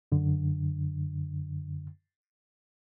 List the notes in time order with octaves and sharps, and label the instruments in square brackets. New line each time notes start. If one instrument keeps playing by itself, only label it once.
[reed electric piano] F#2 D3